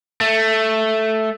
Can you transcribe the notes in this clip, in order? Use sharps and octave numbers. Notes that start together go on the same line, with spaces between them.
A3